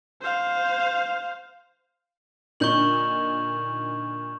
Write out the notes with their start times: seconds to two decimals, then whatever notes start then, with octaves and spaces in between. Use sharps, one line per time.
0.22 C5 F5
2.60 A#2 D3 D#4 C#6 G6 F#7